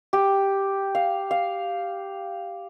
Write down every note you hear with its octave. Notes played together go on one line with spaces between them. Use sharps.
G4
F5
F5